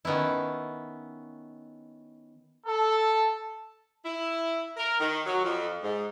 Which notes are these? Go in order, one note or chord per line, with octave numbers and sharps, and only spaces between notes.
D#3 B3 C#4 E4
A4
E4
A#4
D#3
F#3
F2
G#2